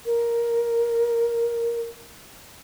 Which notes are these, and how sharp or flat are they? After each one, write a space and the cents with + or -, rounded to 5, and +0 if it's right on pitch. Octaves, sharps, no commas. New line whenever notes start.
A#4 +5